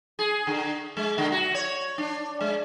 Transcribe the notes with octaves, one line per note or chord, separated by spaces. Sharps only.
G#4
D3
G#3
D3
F#4
C#5
D4
G#3